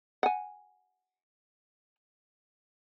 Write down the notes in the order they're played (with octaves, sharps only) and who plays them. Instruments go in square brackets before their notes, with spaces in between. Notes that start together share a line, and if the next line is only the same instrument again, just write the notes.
[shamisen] F#5 G#5